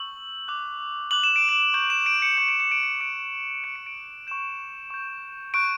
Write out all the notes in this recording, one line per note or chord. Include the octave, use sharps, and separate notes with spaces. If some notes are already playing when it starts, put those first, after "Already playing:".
Already playing: C#6 E6 G6 F#7
D6 F#6
D6 F#6 F#7
E7
D7
E7
C#6 G6 F#7
E7
D7
C#7
C#6 G6 C#7
D7
C#7
D7
C#7
D6 F#6 D7
C#6 F#6 D7
C#7
D7
C#6 G6 E7
C#6 G6
C#6 F#6 D7